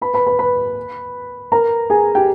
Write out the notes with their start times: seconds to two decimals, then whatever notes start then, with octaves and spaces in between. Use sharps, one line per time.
0.01 B4 B5
0.14 B4 B5
0.26 B4 B5
0.39 B4 B5
1.52 A#4 A#5
1.90 G#4 G#5
2.15 G4 G5